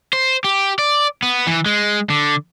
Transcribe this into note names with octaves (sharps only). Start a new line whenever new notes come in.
C5
G4
D5
B3
E3
G#3
D3